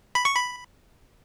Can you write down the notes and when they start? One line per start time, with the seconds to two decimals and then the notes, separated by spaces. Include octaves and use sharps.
0.15 B5
0.25 C#6
0.35 B5